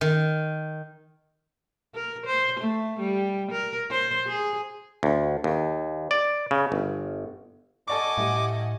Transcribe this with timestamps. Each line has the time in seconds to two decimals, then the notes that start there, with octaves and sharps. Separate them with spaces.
0.01 D#3
1.95 A#4
2.26 C5
2.60 A3
3.00 G3
3.52 A#4
3.90 C5
4.28 G#4
5.03 D2
5.44 D#2
6.11 D5
6.51 C#3
6.72 G1
7.88 A4 D5 D#5 F#5 G#5 C#6 D6
8.17 A2 G3 A3